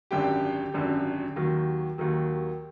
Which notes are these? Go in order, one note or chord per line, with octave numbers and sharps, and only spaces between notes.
G#1 F#2 D3 G4 G5
G#1 F#2 D3
D#2 D#3 F#3
D#2 D#3 F#3